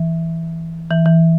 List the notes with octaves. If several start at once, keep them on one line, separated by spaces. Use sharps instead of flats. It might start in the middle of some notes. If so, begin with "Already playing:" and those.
Already playing: E3
E3
E3